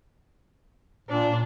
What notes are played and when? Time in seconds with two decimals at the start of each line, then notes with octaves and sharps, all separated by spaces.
1.09 A#2 D4